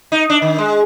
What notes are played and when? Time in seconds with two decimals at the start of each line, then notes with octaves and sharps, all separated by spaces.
0.12 D#4
0.30 D4
0.42 D#3
0.58 G#3